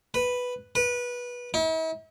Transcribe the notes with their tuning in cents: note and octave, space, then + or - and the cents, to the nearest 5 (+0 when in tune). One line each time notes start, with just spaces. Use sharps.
B4 +0
B4 -20
E4 -45